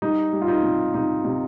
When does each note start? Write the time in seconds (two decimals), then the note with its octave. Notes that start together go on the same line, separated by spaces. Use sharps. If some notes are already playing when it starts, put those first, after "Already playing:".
0.02 G3 D#4
0.33 G3
0.42 F4
0.48 D#4
0.63 C3
0.94 C3 D#4
1.24 C3